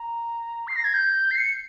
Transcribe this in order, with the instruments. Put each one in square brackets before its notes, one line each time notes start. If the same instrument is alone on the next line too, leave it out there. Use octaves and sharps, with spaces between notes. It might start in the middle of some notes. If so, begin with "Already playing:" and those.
Already playing: [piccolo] A#5
C7
A#6
G#6
G6
C7
C#7